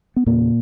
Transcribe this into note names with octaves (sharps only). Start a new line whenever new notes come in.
B3
E2 A#2 C#3 A#3